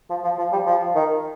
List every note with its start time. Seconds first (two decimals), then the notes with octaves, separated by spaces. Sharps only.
0.10 F3
0.24 F3
0.38 F3
0.52 G3
0.66 F3
0.95 D#3